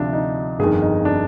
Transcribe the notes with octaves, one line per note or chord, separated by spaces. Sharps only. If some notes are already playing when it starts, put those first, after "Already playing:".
Already playing: D2 C3 F3 D4
D#4
G1 F2 D#3 G#4
D#4
D4